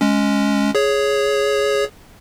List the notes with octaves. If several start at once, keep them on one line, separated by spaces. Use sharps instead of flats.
G#3 C#4
G#4 C#5